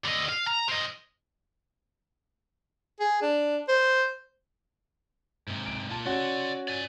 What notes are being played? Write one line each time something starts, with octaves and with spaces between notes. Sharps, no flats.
D3 D#5
F5
A#5
C4 D#5
G#4
D4
C5
G#2 C3
D7
A#3 F4 A5
C#4 F#4 D5 C6
D5 G#5